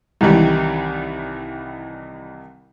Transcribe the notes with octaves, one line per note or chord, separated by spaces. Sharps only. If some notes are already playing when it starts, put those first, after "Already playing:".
C2 C3 D#3 E3 G3